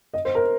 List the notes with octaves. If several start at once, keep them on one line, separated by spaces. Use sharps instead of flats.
D#5
C5
A#4